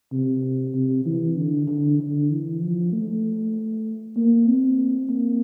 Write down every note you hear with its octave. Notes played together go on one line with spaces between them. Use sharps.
C3
C3
E3
D3
D3
D3
E3
F3
A3
A#3
C4
A#3